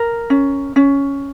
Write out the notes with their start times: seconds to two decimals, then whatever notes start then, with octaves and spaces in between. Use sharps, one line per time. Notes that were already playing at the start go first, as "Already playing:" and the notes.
Already playing: A#4
0.30 C#4
0.76 C#4